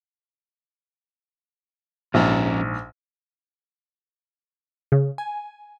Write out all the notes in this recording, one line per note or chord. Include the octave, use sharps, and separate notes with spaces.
A#1 G#2 F3 C#4 A#5
C#3
G#5